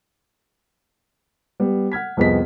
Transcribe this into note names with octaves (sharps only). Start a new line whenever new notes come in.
G3 B3
F#5 F6 G#6 B6
C2 F2 B3 G#4 D#5 B6